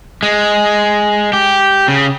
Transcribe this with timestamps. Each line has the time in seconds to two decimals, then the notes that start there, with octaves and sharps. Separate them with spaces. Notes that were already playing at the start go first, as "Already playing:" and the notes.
0.23 G#3
1.33 G4
1.88 C#3